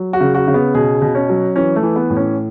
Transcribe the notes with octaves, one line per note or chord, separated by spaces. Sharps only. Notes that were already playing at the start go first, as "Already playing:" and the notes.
Already playing: F#3
F#4
C#3
F#4
C#3
B3
B2 G#4
B2
C#4
F#3
E3 C#4
A3
E3
B3
A2
C#4